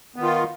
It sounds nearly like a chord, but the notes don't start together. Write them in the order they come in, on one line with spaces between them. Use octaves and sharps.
B3 D#3 F4